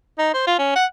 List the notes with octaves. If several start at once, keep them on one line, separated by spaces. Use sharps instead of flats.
D#4
C5
F4
C#4
F#5